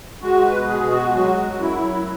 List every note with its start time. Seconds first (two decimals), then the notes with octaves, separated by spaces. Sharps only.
0.22 G#3 F#4
0.45 B4
0.52 B2
0.67 G#4
0.83 G#3
0.90 F#4
1.14 F#3 F#4
1.45 F#2
1.60 E4
1.76 F#3